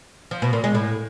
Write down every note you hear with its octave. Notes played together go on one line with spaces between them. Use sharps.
F3
B2
A#2
G#3
A2